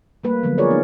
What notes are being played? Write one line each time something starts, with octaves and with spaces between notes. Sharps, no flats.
G3 A3 A#3 B4
D3 F3 F#3 G#3 B3
F4 G#4 A#4 C#5 D5
B3 D#4